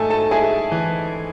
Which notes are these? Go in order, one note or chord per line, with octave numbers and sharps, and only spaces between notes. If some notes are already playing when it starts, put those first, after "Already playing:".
Already playing: G#2 A3 A4 G#5 A5
A4 A5
E4 G#4 G#5
E3